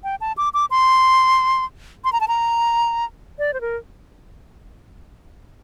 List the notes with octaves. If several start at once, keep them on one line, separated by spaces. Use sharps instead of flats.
G5
A5
D6
D6
C6
C6
A#5
A5
A#5
D5
C5
A#4